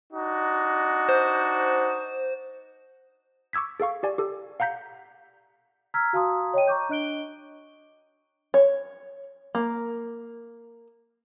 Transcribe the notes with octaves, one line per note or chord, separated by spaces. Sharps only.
D4 D#4 F#4
C5
C#6 D6 E6 G#6 B6
G#4 A4 F5 C#6
G4 D5 G#5
G4 A4
F5 F#5 A#5 G6 B6
A#5 E6 F6 G#6 B6
F#4 F5 A5 A#5 C6 D#6
C#5 D#5 G5 D#7
A#5 C#6 D6 G6
D4 D#5 F#6 D7 G7
C#5
A#3